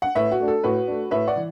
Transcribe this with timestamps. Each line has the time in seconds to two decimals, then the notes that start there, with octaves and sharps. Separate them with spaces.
0.02 F#5
0.15 A2 B4 E5
0.31 F#4
0.40 A3 D4
0.48 A4
0.64 A2 F#4 B4
0.87 A3 D4
1.11 A2 B4 E5
1.27 D5 F#5
1.36 E3